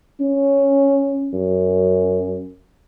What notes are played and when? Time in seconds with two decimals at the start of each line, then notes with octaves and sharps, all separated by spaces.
0.21 C#4
1.33 F#2